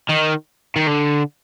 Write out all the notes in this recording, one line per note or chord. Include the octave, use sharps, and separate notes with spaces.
D#3
D#3
D3